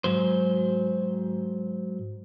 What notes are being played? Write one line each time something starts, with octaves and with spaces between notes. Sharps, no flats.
G#2 F#3 C5